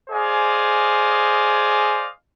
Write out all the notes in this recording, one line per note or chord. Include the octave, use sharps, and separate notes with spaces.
G#4 C5 D5 D#5 F5 G#5